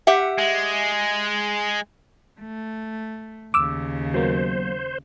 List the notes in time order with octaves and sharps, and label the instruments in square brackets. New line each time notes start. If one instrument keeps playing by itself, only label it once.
[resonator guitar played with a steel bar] G4 E5 F#5
[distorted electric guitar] G#3
[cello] A3
[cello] D#2 C#3 [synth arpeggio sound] D6 E6
[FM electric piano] F#3 A#3 B3 [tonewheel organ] C5